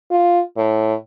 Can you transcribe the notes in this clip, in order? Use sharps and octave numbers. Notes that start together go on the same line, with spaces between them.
F4
A2